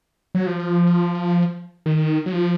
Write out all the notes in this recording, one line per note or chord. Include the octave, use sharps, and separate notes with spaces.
F#3
F3
D#3
F#3
F3